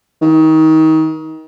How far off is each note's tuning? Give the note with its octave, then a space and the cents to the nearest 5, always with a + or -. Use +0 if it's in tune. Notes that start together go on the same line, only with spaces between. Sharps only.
D#3 +25